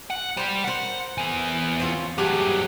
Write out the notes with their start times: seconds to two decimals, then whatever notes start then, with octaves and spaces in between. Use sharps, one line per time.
0.10 F#5
0.37 G3 C5 G5
0.64 A#4 C5 F#5
1.18 E3 B3
1.80 C4 C#4 F4
2.18 G2 F#3 G4 G#4 F#5